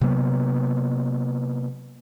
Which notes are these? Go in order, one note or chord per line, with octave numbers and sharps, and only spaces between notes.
C3 F#3 A#3 B3